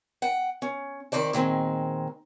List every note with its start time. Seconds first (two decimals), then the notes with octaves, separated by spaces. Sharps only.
0.22 F#5 G5
0.62 C#4
1.12 F2 D#3 C5 D5 A5
1.33 A#2 D#3 G#3 C4